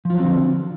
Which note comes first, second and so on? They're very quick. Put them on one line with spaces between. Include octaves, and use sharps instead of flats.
F3 F4 F#3 C4 D3